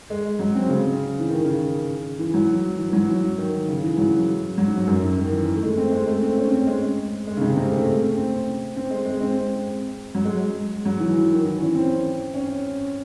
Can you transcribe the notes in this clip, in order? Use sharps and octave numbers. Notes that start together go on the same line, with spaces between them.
G#3
F#3
C4
C#3
E3
D#3
C#3
E3
F#3
E3
E3
F#3
D#3
C#3
E3
F#3
F#3
G#2
G#2
F#2
D#3
E3
A3
G#3
C4
G#3
A3
C4
C#4
C4
G#3
G#3
C#3
C3
C3
A3
C4
C4
G#3
G#3
C4
F#3
G#3
F#3
E3
D#3
E3
C#4
C4
C#4